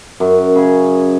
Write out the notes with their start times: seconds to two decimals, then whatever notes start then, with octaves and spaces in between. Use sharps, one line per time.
0.20 F#2
0.55 C#3 G#4